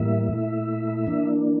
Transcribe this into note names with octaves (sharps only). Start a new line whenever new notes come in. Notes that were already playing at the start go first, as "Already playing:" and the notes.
Already playing: A2 E3 G3 A#3 E5
A#2 A3 E4
E3 A#3 D4